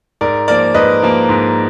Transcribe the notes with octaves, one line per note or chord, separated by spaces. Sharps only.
G#2 A#4 D5
F3 A#3 A#4 D5
G#2 B4 D#5
F3 A#3
G#2